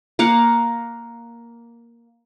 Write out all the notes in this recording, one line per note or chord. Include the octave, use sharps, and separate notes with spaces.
A#3 A#4 F5 F#5